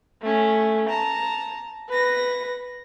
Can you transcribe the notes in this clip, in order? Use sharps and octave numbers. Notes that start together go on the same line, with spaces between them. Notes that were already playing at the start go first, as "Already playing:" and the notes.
A3 C#4
A5 A#5
B4 A#6